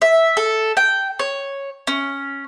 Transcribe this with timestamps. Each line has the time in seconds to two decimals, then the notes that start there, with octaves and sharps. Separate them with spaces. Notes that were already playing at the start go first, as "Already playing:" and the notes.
0.02 E5
0.37 A4
0.77 G5
1.19 C#5
1.87 C#4